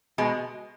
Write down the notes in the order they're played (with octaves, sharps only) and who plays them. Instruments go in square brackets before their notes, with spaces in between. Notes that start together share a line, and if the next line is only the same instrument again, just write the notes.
[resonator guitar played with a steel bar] B2 G#3